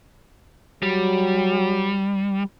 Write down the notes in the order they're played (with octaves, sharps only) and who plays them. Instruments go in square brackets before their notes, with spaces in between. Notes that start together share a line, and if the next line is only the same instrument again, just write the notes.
[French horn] F#3 [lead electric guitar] G3